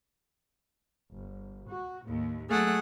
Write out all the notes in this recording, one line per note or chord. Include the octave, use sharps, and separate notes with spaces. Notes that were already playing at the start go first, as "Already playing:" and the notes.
G1
F#4
D#2 A2
F#3 A3 G#4 F#5